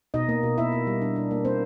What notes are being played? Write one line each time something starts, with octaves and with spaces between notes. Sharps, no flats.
B2 D#4 D#5
A#3
B2
A#3 E4 E5
A#3
G3
D4
D4
A#3
A#3 C4 C5